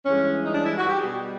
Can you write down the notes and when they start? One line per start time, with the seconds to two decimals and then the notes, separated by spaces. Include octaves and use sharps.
0.05 G2 E3 G#3 C#4
0.45 D#4
0.54 D4
0.66 E4
0.78 F#4
0.89 G4
1.00 B2 G3 G#4